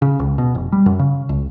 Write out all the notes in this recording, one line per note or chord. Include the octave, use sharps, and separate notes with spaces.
C#3
C#2
B2
F1
G3
F#2
C#3
C#2